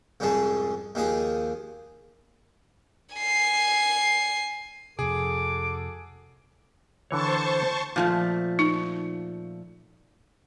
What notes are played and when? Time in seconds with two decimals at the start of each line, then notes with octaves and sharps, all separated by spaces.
0.20 C2 F2 G#2 C#4 G#4 A5
0.95 D#2 D#3 F3 G#4 D#6
3.15 G#5 C7
4.99 F2 C3 F#4 G#4 A4 D6
7.11 D3 E3 C5 C#5 A5 C#6
7.96 A#2 F3 A3
8.59 D#4